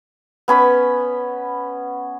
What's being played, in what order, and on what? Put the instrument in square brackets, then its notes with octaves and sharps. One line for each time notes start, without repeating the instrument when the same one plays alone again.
[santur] B3 C#4 B5